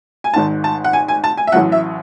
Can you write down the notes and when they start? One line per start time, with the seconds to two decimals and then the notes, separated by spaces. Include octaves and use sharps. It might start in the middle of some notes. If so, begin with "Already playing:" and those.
0.24 G#5
0.34 G#1 G#2 D#3 A5
0.64 A5
0.84 F#5
0.93 G#5
1.08 G#5
1.24 A5
1.37 G#5
1.47 E5
1.52 A1 A2 F#3 F#5
1.72 E5